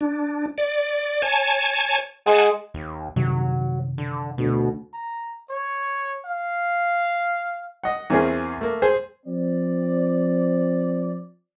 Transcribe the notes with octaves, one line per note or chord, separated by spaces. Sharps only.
D4
D5
C#5 G#5 A5
G#3 F#5 G#5 A5
D#2
F#2 C3 D#3 F#3
D3
D2 B2
A#5
C#5
F5
D#5 F#5
E2 A#3 C4 C#4 G#4
A3 A#3
G#4 C5
F3 C4 D5